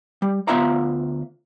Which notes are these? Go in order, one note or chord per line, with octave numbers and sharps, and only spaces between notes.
G3
D2 B3 F4 E5 F5 A#5